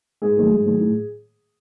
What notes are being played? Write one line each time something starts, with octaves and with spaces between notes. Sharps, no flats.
G#2 G#4
D#3 F#3 A3
G#2
D#3 F#3 A3
A2